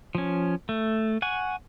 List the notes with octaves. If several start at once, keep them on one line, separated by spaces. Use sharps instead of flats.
F3 C#4
A3
F#5 G#5 C#6